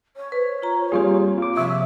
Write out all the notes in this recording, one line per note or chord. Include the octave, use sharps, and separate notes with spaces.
C#5
B4 C5
F4 A#5
G3 A#3 C4 F4 G4 G#4
F4 D6
C3 F3 E5 C#6